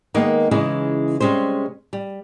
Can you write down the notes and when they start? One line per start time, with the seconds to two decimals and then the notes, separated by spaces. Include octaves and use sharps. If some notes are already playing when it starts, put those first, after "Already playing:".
0.14 D#3 G#3 A#3 B3 D#4
0.51 C#3 E3 G#3 C#4 D#4 E4
1.20 C3 G3 G#3 C#4 C5
1.93 G3